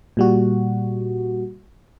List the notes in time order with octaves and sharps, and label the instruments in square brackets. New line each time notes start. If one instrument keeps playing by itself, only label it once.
[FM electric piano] A#2 G3 F#4